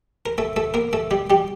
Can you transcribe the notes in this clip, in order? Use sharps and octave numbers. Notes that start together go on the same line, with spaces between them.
A#4
A3 A4
A3 A4
A#3 A#4
A3 A4
G3 G4
G3 G4